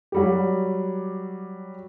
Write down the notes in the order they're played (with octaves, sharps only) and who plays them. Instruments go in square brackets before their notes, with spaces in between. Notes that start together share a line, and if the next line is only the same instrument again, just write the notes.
[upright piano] F#3 G3 G4